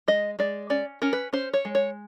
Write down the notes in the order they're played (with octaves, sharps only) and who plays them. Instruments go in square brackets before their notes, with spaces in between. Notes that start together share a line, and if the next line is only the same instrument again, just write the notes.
[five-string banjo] G#3 D#5
G#3 D5
C#4 D5
C#4 A#4
B4
C#4 C5
C#5
G#3
C#5